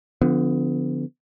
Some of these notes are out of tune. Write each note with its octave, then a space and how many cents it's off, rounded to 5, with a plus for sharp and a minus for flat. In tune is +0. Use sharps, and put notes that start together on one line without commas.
D3 +0 F3 +0 B3 +35